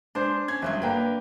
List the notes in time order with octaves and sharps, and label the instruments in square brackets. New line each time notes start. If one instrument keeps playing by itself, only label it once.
[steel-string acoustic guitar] G#3 [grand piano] D4 C5
[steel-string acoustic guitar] C#4 [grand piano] G#6
[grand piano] G1 F#2 [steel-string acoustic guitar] D#3 G#3 E5
[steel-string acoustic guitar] D3 A#3 [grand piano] B4 G5 A#5